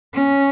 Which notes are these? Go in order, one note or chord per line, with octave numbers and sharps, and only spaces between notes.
C#4